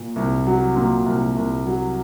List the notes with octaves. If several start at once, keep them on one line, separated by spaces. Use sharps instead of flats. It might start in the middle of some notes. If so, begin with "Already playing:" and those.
Already playing: A#2
C2
F#3
A#2
C2
C2
F#3